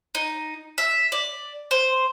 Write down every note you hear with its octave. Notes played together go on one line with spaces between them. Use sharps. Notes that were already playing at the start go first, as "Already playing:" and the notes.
D#4
E5
D5
C5